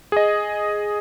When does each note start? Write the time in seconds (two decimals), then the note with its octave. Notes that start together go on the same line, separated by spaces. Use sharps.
0.12 G#4 D#5